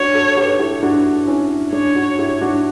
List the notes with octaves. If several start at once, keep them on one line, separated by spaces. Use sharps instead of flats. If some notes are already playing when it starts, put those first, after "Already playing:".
Already playing: D4 F#4 C#5
F#4 A4
G4 B4
E4 G4
D4 F#4
C#4 E4
D4 C#5
D4 F#4
E4 G4
D4 F#4